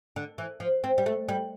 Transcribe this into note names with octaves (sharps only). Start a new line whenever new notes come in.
D3
E3
F3
C4
G3
A3
G3